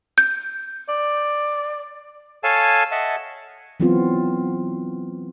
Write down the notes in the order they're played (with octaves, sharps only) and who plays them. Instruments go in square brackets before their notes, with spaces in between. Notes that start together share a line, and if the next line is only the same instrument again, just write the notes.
[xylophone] G6
[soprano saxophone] D5
[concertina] A4 C#5 F5 G#5 A5
D#5 E5 F#5 A5
[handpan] E3 F#3 B3 C4 F4